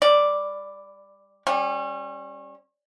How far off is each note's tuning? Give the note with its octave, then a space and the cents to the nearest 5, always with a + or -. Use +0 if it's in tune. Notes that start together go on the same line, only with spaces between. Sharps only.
G3 +25 D5 +0
G3 +0 C#4 -30